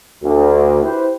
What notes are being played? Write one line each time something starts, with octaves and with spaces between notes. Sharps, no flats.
D2
E4 G4 B4 C5